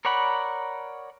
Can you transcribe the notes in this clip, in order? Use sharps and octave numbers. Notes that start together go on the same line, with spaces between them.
A#4 C#5 D5 F#5 B5